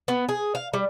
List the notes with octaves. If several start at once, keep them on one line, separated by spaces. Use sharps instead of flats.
B3
G#4
F5
G3